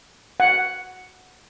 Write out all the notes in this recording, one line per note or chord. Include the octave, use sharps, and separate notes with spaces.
F#5